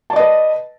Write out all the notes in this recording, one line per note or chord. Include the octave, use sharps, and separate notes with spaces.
B4 D5 D#5 A5